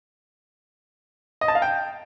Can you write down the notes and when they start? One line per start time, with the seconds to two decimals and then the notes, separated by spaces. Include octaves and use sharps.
1.41 D#5
1.48 A5
1.55 F5
1.62 G5